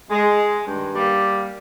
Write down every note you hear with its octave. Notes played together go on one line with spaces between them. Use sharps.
G#3
G2 D#3
G3 A#3